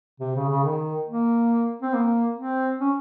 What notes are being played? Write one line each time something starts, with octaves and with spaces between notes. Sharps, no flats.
C3
C#3
C#3
D#3
A#3
C4
A#3
C4
C#4